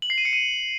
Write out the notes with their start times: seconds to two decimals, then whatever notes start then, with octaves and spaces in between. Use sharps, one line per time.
0.02 F#7
0.10 C7
0.18 D#7
0.25 C#7
0.33 D#7